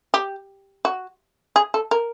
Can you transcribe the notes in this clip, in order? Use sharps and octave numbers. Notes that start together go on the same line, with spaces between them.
G4
F#4
G#4
A4
A#4